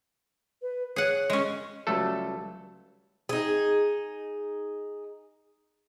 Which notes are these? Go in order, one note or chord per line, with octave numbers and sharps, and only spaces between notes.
B4
G#4 C#5 F#5
G#3 C#4
C#2 F#3 G3 A3 A4
D#4 G#4